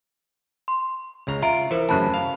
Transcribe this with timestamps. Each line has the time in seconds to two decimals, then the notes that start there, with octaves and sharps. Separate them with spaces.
0.68 C6
1.27 C#2 C#3 A#5
1.42 F4 E5 A#5 D7
1.71 E3 A#4 C5
1.89 F#2 C#3 A3 A5 B5 F#6
2.14 F5